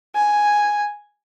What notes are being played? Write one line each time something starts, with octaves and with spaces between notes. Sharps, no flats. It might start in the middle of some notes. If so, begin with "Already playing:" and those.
G#5